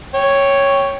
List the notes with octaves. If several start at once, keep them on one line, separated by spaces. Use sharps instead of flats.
C#5 G5